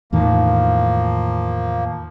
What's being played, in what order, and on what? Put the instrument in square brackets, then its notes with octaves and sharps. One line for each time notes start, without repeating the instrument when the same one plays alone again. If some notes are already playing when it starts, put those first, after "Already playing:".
[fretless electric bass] E2 A2 D#3 [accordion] F3 A#3